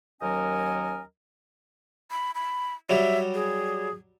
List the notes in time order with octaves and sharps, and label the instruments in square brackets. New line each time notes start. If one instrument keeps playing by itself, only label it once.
[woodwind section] D#2 F#3 C#4 A#4 D#5 G#5
[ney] B5
B5
[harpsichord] F#3 G3 G4 [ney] E5
[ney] G#4